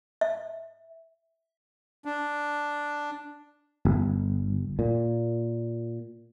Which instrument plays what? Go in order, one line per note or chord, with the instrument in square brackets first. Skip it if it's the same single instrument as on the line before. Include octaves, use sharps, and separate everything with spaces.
[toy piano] E5
[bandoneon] D4
[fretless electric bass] G1
A#2